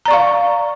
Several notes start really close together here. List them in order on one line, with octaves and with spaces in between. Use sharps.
A#5 D5 C#6 F5